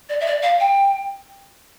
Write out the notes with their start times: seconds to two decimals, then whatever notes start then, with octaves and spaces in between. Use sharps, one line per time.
0.09 D5
0.21 E5
0.26 D5
0.42 F5
0.60 G5